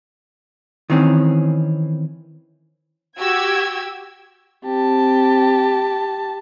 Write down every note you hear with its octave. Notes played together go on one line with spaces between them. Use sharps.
D#3 E3 C4 C#4
F#4 G4 G5 E6 G#6
C4 G4 A5